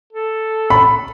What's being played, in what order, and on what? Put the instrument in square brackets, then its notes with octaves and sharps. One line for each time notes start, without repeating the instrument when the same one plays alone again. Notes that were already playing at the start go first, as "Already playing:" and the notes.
[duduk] A4
[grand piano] B5